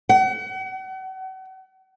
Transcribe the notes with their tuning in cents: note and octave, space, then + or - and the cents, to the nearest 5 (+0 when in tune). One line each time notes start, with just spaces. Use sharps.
F#5 +40